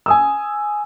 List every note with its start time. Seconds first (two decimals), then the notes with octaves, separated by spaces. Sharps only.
0.06 G#5 D#6 E6